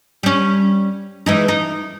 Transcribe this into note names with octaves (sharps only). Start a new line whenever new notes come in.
G3 C#4
E3 G#3 D#4
D#4